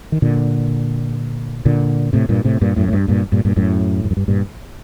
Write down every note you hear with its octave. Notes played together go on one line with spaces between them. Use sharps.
D#3
A#2 D3
A#2 D3
A2 C3
G2 A#2
A2 C3
G2 A#2
F#2 A2
A2
G2
G2 A#2
G2 A#2
G2 A#2
F#2 A2
G2
F#2
G2
G2 A#2